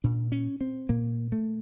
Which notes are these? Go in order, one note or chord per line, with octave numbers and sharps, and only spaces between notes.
A#2 D4
C#4
C4
A#2 A#3
A3